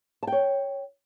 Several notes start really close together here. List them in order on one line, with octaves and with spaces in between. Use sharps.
A5 G5 C#5